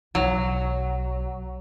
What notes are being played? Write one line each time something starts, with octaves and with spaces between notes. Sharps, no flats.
B1 F#3